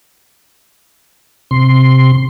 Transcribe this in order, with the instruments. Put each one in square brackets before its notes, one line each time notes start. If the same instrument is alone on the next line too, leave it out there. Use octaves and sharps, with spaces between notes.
[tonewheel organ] C3 C6